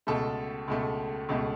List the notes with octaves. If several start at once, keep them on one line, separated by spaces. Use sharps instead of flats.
C#2 B2 A3 A4
C#2 B2 A3
C#2 B2 A3